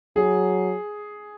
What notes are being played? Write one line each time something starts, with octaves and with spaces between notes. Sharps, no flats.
F#3 G#4